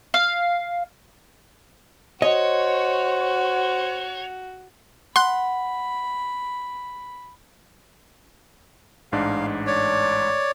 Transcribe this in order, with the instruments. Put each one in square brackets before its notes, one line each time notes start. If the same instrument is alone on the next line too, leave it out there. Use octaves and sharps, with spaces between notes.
[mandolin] F5
[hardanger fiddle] F#4 [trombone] C5 [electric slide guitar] C#5 [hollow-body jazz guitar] D#5
[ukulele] F#5 [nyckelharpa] B5 [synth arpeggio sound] C6 F#6
[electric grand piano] A1 G#2 D4 [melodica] F5
[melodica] C#5 D5